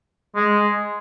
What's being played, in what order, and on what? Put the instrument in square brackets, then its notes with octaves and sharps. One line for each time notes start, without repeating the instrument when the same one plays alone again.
[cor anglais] G#3